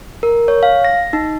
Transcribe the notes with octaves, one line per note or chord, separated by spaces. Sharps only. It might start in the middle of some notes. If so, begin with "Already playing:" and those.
A#4
C#5
F5
A#6
D#4